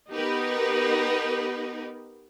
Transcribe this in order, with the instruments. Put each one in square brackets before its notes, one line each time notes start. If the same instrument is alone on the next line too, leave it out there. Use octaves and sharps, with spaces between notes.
[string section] B3 D#4 G4 A#4 B4